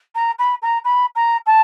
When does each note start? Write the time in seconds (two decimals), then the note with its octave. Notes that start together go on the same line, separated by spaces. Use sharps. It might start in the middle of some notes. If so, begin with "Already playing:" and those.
0.15 A#5
0.39 B5
0.62 A#5
0.85 B5
1.16 A#5
1.46 A5